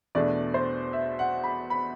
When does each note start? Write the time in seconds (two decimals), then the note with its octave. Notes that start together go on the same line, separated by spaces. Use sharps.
0.15 E2 B2 A3 D4 D5
0.54 C5
0.93 E5
1.19 F#5
1.44 B5
1.70 B5